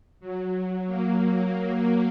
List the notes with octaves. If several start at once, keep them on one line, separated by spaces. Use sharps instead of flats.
F#3
A#3